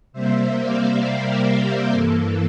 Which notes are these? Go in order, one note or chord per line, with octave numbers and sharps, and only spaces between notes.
C3 G3 A#3 C5 E5
D5 F5
A#4 D5
G4 A#4
G2 E3 A#3 A4